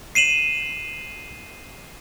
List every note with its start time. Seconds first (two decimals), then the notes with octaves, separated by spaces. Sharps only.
0.15 C7 D#7 E7 F#7